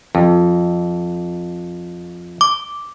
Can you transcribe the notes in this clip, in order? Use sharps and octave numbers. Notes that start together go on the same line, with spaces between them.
F2
D6